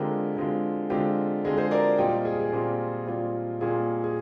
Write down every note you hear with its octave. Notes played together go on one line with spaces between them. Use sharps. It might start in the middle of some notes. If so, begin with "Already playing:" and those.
Already playing: D3 G#3 C4 F4 G4 A#4
D3 G#3 C4 F4
D3 G#3 C4 F4 G4
D3 G#3 C4 F4 G#4
G#4 C5
A#4 D5
A#2 G3 C4 F4 D#5 G5
G#4
G#4
A#2 G3 C4 F4
A#2 G3 C4 F4
A#2 G3 C4 F4 G#4
G#4